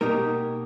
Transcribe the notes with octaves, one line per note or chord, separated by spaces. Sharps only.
B2 A#3 D#4 G4 A#4